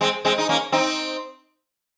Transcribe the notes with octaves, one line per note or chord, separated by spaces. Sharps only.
G#3 C4
G#3 C4
D#4
A#3 C#4
C4 D#4